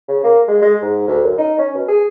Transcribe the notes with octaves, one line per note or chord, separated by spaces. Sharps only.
C#3
A#3
G#3
G#3
G#2
D2
F#2
D#4
C#4
B2
G#4